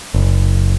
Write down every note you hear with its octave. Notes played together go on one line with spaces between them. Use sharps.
F#1